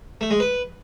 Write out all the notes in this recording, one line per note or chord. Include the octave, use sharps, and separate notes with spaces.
A3
G#3
B4